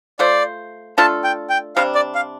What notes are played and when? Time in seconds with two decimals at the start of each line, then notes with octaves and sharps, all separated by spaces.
0.19 A3 F4 C5 D5
0.98 A3 D4 F4 A4 A5
1.24 G5
1.50 G5
1.76 C3 G3 D4 F5
1.95 D5
2.15 F5